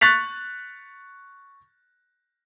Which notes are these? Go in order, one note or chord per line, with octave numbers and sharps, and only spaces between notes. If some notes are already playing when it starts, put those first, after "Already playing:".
C#6 F#6 A6 B6 F7